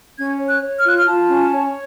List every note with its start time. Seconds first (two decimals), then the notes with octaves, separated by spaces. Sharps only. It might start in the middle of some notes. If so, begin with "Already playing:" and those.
0.17 C#4 G#6
0.40 C#5
0.47 F#6
0.63 C#5
0.77 F6
0.85 F4 F#6
0.96 F6
1.07 F4 A5
1.29 C#4
1.52 C#5